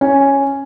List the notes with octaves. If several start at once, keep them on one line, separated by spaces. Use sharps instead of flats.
C#4